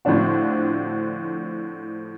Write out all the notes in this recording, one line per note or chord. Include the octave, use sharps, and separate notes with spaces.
A2 D3 F3 C4 D4 F#4